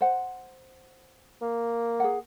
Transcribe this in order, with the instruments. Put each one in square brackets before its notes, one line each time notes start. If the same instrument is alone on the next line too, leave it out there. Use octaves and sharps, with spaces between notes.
[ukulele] C5 F#5
[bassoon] A#3
[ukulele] G#4 F#5